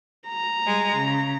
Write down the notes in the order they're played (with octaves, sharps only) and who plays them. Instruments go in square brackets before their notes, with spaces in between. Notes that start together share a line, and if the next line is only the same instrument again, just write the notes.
[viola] A#5
[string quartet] G3 G#3
C#3